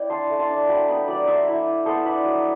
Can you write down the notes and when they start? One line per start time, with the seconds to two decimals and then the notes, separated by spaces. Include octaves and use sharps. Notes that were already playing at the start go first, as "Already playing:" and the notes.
Already playing: E4 D5 G5
0.10 D4 A5 C6
0.30 A3
0.39 A5 C6
0.49 D4
0.69 F#3 G5 B5
0.88 B3 G5 B5
1.07 F#3 B4 D5
1.27 A3 C5 E5
1.47 E4
1.66 E4
1.86 B3 A4 C5
2.05 D4 B4 D5
2.25 F#3